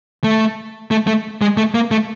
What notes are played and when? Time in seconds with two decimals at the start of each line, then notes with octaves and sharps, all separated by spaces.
0.24 A3
0.91 A3
1.07 A3
1.41 G#3
1.57 A3
1.74 A#3
1.91 A3